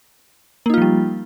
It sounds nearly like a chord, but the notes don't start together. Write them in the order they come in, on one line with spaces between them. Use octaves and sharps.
A#3 D#4 F4 F3 G3